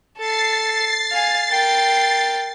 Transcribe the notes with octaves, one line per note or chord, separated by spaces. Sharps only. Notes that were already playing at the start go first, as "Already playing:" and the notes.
A4 A6 C7
F5 G#5
A#4 G5